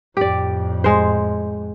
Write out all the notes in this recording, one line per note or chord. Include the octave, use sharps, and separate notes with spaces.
F2 A2 G4 D5
G#3 C5